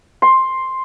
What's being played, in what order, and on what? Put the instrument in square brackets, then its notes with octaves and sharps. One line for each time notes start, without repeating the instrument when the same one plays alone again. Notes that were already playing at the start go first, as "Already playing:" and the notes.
[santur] C6